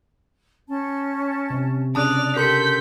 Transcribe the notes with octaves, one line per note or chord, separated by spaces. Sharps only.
C#4 A5
C3
C#3 D4 D5 A5 D#6 F#6 F7
G4 A4 A#4 A5 C6 G6 B6 C#7